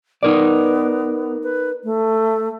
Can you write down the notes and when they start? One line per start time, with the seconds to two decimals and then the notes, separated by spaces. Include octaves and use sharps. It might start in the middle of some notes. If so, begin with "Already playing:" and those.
0.23 B3 D#4 A#4 D5
1.43 B4
1.84 A3